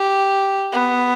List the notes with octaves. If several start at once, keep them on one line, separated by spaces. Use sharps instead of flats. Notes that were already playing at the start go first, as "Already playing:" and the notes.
Already playing: G4
B3